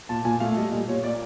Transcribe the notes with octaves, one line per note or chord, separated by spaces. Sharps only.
A#2 A5
A#2 G#5
A3 F5
G3 D#5
A#2
A#2 C#5
A#3 D5